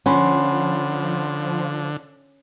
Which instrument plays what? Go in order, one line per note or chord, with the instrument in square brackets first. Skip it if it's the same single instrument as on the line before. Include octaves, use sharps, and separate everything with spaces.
[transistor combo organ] D3 [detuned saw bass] F3 [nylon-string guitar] C#4 [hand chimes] F#5 B5 C6